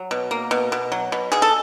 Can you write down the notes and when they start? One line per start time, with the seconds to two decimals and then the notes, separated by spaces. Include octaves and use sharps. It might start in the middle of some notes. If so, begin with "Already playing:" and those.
Already playing: F#3
0.11 B2
0.31 A#3
0.51 B2
0.72 B2
0.92 F#3
1.12 B2
1.32 B2 G#4
1.42 A4